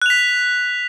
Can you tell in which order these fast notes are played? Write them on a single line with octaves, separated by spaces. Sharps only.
F#6 F7 B6